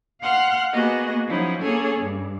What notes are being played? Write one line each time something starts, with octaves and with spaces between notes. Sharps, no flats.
F5 F#5 C6 F6 F#6
A#3 B3 F#4 G#4 D#5
F3 F#3 C#4 D#4 E4
A#3 C#4 G#4 A4 C#5 G#5
G2